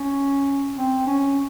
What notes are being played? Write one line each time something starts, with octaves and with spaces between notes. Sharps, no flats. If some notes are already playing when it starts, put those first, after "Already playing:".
Already playing: C#4
C4
C#4